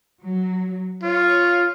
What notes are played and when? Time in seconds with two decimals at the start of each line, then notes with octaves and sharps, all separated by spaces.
0.24 F#3
1.03 F4 C#5